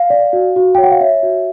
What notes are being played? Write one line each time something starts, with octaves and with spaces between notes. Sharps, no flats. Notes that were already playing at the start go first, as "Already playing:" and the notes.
Already playing: F5
D5
F#4
F#4
C#5 G5
F#5
F5
C#5 E5
F#4